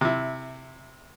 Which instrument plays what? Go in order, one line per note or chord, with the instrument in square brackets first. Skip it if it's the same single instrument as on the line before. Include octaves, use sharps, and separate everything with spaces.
[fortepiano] C3 E4